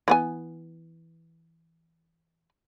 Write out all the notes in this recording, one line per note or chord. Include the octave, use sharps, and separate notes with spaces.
E3 B3 G#5